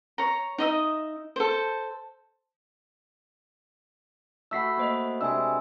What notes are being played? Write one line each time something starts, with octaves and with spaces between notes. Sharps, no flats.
C#5 A#5
D#4 D#5 E5
A4 C5
A3 F#4 B5 E6 B6 C7
A#3 C5 D#5
C3 G#3 D4 G#5 E6